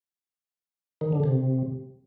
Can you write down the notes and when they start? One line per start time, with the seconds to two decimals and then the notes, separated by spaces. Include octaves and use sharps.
1.01 D#3
1.12 D3
1.24 C3